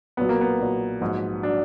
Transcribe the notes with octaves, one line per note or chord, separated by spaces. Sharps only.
B1 A#2 F#3 B3
A#3
B3
B1 A#2 F#3
A#1 G#2 F#3
F#3 D4